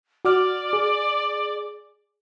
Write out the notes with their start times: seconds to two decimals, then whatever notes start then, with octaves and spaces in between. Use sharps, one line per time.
0.25 F#4 D5 D6 F6
0.73 G#4